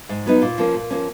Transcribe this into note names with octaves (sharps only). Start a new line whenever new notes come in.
G#2
F#3 B3 D#4
A#2
F3 A#3 C#4
A#2
F3 A#3 C#4